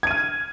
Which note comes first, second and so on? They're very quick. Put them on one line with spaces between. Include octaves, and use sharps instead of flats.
G#6 D#7 F6